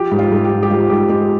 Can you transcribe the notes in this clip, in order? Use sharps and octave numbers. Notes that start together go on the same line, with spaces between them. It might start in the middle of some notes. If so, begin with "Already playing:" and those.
Already playing: F3 G4
G#2
F4
G#2
G4
F3
G4
G#2 F4
G#2 G4
G#3 G4